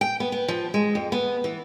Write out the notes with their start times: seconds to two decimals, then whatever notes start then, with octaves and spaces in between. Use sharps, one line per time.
0.01 G5
0.20 B3
0.32 B3
0.48 F3
0.74 G#3
0.95 F2
1.12 B3
1.44 E3